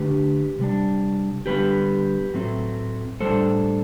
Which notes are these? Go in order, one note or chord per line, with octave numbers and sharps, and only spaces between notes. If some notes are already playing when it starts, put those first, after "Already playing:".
Already playing: D3 A3 D4 G4 B4
C3 G3 D4
D3 G3 B3 G4 B4
A2 F#3 A3 C4
A2 G3 D4 A4 C5